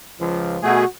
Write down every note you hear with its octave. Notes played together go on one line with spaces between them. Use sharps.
C#2 F3
B2 A3 F#4 G#4